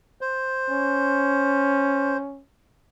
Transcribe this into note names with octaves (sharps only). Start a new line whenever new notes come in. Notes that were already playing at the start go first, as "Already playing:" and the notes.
C5
C#4